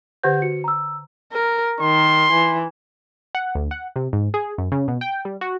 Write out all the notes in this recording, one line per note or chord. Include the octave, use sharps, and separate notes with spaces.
D3 G4 C5 F#5 G6
F#4 C#7
A#5 E6
A#4
D#3 C6
E3
F#5
D2
F#5
C3
G#2
G#4
F#2
C#3
B2
G5
G3
F#4